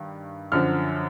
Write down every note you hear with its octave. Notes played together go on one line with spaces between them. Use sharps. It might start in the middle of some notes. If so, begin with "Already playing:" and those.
Already playing: G2 D#3
F#2 D3 F3 F6